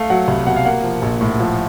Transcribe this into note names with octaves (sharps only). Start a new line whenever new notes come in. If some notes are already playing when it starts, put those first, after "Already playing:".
Already playing: A3 F5
F#3 F#5
C2
B2 F#5
F5
A#3 F#5
F3
A#1
A2
F3